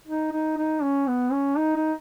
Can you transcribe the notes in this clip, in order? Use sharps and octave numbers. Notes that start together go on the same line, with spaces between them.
D#4
D#4
D#4
C#4
B3
C#4
D#4
D#4